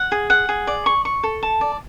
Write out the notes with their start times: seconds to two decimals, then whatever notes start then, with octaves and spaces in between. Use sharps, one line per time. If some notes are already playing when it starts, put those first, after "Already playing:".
Already playing: F#5
0.12 G#4
0.30 F#5
0.49 G#4
0.67 D5
0.86 C#6
1.05 C#6
1.23 A4
1.43 A5
1.61 D5